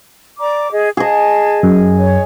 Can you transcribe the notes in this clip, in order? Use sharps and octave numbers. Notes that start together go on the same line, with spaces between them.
D5 A#5 D6
G#4 D#5
G#4 D#5 A5
F#2
C#5